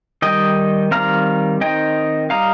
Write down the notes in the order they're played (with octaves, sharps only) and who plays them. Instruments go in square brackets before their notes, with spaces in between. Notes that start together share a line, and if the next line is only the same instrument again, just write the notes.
[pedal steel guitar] D#3 G3 D#4 D#5 G5
D#3 G3 C4 F5 A#5
D#3 C4 D#4 D#5 G5
G3 D#4 F5 A#5